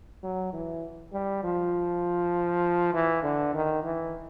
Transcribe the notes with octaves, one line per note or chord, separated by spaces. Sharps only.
F#3
E3
G3
F3
E3
D3
D#3
E3